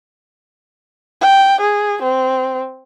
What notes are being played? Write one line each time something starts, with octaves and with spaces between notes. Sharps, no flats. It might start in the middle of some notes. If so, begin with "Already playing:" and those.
G5
G#4
C4